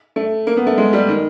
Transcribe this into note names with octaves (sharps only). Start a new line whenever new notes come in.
A3
A#3
B3
A3
G#3
G3
D#3